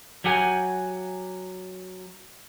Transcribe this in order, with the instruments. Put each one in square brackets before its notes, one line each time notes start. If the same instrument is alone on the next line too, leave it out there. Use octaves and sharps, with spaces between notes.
[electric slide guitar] F#3 G4 F#5 G#5